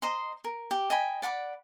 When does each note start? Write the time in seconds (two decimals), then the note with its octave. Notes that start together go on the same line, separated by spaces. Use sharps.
0.02 C5 D#5 A#5 C6
0.44 A#4
0.71 G4
0.90 D#5 G5 G#5 B5
1.22 D5 F#5 B5 D6